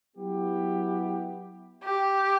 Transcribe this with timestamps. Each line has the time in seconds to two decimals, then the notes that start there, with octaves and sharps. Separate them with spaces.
0.16 F#3 B3 E4 G4
1.84 G4